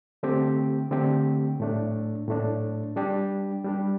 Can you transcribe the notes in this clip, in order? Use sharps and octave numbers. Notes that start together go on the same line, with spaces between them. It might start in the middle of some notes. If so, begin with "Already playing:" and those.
D3 A3 C4 G4
D3 A3 C4 G4
A2 A3 D4
A2 A3 D4
G3 D4 G4
G3 D4 G4